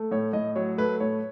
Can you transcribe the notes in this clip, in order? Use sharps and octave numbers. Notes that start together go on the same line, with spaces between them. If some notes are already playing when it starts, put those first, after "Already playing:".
Already playing: A3
A2 C#5
A2 D#5
F#3 C#5
A3 B4
A2 C#5